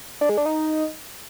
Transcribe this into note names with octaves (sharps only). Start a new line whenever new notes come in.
D4
G#3
D4
D#4